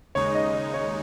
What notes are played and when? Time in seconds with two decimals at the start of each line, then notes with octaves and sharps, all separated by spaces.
0.15 D#2 C#3 G#3 D#4 C#5
0.35 D#5
0.54 D#5
0.74 C#5